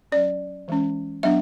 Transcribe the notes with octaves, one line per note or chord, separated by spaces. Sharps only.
F#3 C#4 D5
E3 G#3 C#4
F#3 B3 D4 E5